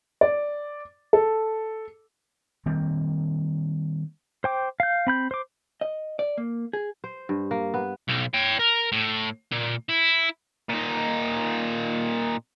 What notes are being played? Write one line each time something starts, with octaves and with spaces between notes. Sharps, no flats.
D5
A4
D#3 G3 A#3 C4
C5 G5 D6
F5 G6
C4 B5 G6
C5 D6
D#5
D5
A#3
G#4
C5
G2
A#3
B3
B1
C#5 G5
A#4
A2
A#2
E4
A#2 D#4